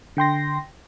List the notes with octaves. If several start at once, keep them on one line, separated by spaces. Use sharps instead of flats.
D3 G5 C6 A#6